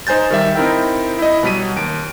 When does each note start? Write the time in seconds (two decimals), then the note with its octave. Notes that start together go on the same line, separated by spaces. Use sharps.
0.07 D#4 C5 G#5 G6 A6
0.31 D#3 G3 E5
0.55 C4 D#4 E4 A#4 E5 G5
1.19 E4 D#5
1.43 B2 F#3 G3 B6 D#7
1.76 D#2 D7